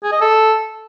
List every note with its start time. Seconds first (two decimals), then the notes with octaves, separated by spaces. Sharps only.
0.03 G#4
0.12 D#5
0.21 A4